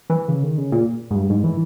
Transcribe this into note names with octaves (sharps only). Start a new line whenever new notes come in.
E3
C#3
D#3
C#3
A#2
G#2
G2
G#2
E3